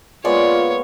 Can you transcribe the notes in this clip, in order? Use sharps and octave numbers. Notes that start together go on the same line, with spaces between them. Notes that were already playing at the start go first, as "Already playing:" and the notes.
G#3 A#3 B3 F4 C#5 D5